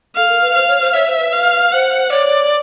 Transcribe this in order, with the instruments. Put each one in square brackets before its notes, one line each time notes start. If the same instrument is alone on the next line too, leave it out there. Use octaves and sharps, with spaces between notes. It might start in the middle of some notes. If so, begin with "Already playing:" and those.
[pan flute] A4 [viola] F5
[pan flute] A#4
B4
[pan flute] C5 [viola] F5
[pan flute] C#5
C5
[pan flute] C#5 [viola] E5
[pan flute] C5
B4
[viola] F5
[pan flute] C5 [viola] F#5
[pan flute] C#5 [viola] D5